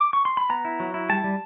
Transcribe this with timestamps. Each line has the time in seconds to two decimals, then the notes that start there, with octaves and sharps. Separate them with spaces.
0.00 D6
0.13 C#6
0.25 C6
0.37 B5
0.50 B3 A#5
0.65 E4
0.80 F#3
0.94 E4
1.09 G3 A5
1.24 G3